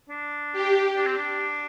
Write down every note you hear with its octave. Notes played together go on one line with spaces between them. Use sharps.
D4
G4
D4
C4
D4